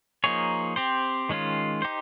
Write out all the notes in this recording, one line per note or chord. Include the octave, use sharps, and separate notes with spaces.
F3 A#3 D#4 G#4 C#5
C4 G4 C5
D#3 G#3 C#4 F4
D#4 G4 C5